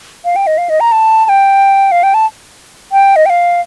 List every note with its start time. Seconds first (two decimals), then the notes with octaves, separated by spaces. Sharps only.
0.25 F5
0.36 G5
0.47 D#5
0.58 F5
0.69 D#5
0.80 A#5
0.92 A5
1.25 A5
1.29 G5
1.92 F5
2.03 G5
2.14 A5
2.92 G5
3.16 D#5
3.26 G5
3.30 F5